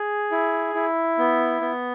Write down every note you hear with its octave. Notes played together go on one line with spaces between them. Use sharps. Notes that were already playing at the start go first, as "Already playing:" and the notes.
Already playing: G#4
E4
E4
B3
B3